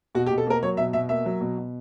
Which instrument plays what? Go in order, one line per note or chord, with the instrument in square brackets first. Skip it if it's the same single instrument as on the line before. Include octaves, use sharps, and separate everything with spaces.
[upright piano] B2 F#4
G4
B2
A4
A#3 A#4
F#3 C#5
B2 E5
B2 E5
A#3 E5
F#3
B2
B2